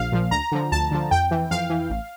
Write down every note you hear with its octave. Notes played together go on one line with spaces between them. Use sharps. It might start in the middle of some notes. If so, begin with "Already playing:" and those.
Already playing: A#1 A#2 F3 F5
A#2 F3
D2 A#5
D3 F3
D2 A5
D3 F3
F2 G5
E3
F2 F5
E3
A1